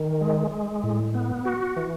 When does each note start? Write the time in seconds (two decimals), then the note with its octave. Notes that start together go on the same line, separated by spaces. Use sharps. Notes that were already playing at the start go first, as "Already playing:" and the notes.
Already playing: D#3
0.21 G#3
0.51 G#3
0.83 A2
1.14 B3
1.45 F#4
1.76 E3